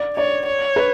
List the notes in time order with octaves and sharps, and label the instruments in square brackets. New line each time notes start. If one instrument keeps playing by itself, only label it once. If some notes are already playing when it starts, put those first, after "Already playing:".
Already playing: [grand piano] D5
[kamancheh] C#5 [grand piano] D5
[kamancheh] C#5
[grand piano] B4